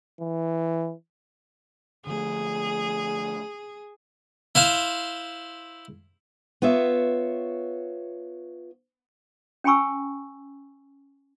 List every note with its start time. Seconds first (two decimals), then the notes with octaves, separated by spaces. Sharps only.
0.21 E3
2.07 D3 F3 A3 G#4
4.55 E4 C5 F5 C6
6.62 B3 F4 C#5 E5
9.64 C#4 G5 G#5 B5 C#6 E6